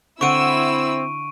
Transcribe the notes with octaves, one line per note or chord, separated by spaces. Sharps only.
D3 C4 E4 F#5 C#6 E6 D7 D#7